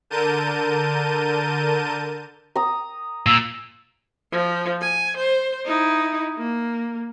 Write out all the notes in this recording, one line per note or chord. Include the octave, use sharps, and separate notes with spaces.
D3 A#4 A5 G6 D#7
A#5 D#6
A#2 E6
F3
G#5
C5
D#4 E4
A#3